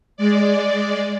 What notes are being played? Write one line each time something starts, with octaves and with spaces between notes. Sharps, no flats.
G#3 D5